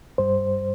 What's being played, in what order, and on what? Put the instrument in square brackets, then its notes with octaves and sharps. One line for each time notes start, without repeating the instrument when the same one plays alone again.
[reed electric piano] G2 G3 C5